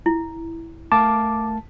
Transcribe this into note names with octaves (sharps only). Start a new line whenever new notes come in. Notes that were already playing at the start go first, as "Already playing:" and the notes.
E4
A3 A#4 F5 A5 D6